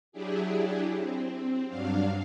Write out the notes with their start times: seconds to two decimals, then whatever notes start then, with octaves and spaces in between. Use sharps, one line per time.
0.12 F#3 D4 E4 G4 G#4
0.96 C4
1.68 G2 F#3 D4 F5